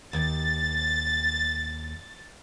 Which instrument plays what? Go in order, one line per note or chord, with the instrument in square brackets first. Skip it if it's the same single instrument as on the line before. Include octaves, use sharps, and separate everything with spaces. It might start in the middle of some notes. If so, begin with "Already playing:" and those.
[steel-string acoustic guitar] D#2 [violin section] A6